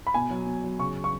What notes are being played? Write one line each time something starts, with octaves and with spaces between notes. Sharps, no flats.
B5
B2 G#5
F#3
B2
F#3
C#3 C#6
C#6